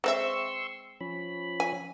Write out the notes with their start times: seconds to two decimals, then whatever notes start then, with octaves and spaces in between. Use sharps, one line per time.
0.04 G#3 C4 E5 C6 C#6 E6
1.01 F3 C#4 B5
1.60 G#5